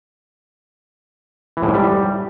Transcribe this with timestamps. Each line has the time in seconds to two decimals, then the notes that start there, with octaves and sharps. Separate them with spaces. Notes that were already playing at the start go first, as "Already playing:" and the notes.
1.57 E3
1.63 A2
1.68 G#2
1.74 G3